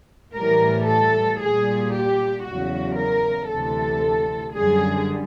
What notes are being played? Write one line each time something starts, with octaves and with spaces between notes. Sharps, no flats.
A2 E3 G3 A#4
A4
A#2 G3 G#4
G4
E2 C#3 F#3 F#4
A#4
D2 C3 E3 A4
F#2 D3 G3 G#4